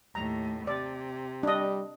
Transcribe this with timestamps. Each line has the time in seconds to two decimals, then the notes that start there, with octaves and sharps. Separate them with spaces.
0.15 D#2 A2 A#5
0.67 C3 D5
1.43 G3 D4 D#5